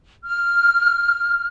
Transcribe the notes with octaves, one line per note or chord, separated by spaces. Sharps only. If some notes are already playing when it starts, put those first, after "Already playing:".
F6